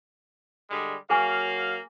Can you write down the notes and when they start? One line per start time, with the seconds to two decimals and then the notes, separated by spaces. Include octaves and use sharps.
0.70 D3 G3 G#3
1.10 F#3 A#3 G#4 F5 G#5 C#6